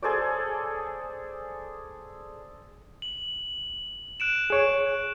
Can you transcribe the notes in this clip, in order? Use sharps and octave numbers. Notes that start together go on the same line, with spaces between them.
G#4 A4 C5 D5
F#7
F#6 D7 E7
G#4 C#5 E7